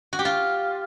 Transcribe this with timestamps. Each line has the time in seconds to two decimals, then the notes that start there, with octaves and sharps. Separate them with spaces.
0.13 F#4
0.19 G4
0.25 F4